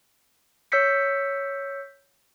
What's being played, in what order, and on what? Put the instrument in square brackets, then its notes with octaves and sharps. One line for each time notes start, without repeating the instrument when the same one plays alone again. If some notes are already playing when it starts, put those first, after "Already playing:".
[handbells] C#5 E6 G6 B6 C#7